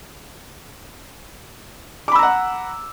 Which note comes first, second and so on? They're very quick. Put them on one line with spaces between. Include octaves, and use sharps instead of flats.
D6 B5 E6 A#5 F#5